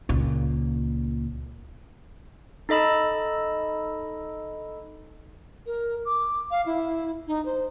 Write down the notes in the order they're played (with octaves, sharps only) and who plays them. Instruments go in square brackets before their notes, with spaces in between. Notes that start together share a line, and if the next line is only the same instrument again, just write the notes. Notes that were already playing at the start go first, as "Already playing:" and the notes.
[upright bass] C#2 A#2
[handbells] D#4 A4 D#5 B5 E6
[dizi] A#4
D6
F5
E4
D#4
C5